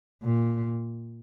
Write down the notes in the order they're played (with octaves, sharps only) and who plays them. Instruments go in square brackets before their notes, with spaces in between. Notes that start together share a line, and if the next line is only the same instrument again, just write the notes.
[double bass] A#2